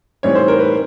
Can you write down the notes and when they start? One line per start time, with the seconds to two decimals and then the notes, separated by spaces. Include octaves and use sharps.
0.23 A2 E3 G3 C4 D#4 C#5
0.35 C5
0.48 A#4
0.60 B4